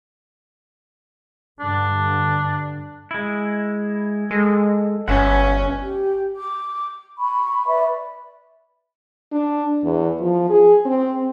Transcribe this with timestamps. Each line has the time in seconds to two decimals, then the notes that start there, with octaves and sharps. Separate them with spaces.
1.60 G2 D3 D4
3.11 G#3 E4
4.31 G#3 A4
5.08 G1 C#4 B4 E5 F#5
5.82 G4
6.35 D6
7.17 B5 C#6
7.66 B4 D5 E5 B5
9.32 D4
9.84 E2
10.21 F3
10.50 G#4
10.85 C4